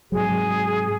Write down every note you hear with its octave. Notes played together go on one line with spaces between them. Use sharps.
G#2 C3 F#3 G#4